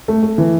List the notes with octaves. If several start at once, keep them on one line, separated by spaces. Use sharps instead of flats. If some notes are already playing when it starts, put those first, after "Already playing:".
A3
A3
E3